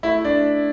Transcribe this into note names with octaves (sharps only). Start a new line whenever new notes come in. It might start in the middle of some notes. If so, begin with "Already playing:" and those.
A3 E4
D4